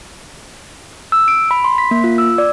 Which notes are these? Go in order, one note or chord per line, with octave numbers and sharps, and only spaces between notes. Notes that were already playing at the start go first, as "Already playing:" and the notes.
E6
D7
B5
C6
B6
A#3
F4
E6
D5